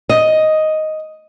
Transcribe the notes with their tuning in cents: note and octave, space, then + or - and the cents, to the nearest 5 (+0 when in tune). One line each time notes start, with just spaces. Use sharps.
D#5 +5